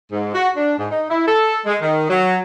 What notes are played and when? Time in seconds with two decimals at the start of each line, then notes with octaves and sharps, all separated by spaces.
0.12 G#2
0.35 F#4
0.56 D4
0.78 G#2
0.90 D#4
1.10 E4
1.28 A4
1.66 G#3
1.81 D#3
2.09 F#3